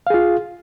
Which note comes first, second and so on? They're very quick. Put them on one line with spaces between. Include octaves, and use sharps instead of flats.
F5 G#4 F4